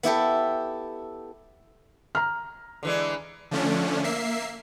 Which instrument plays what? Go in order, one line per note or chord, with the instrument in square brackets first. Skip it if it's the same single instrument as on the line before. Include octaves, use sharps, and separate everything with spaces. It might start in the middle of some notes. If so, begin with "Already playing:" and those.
[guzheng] B3 E4 G4 A4
[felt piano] A#5 F6
[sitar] D3 E3 G#3
[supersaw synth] D3 F3 A3 C#4 D4
A#3 E5 C7